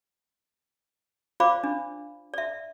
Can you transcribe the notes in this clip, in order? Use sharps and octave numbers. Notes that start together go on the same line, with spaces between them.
F4 C5 D5 F5 B5 D6
D4
D5 E5